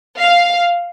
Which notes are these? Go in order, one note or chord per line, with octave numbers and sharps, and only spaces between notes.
F5